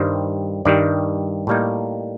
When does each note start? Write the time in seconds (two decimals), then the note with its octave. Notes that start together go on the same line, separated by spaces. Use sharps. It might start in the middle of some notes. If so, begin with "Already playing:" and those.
Already playing: G2 D#3 G3 C5
0.65 G2 D#3 G3 D5
1.47 A2 G3 A#3 D#4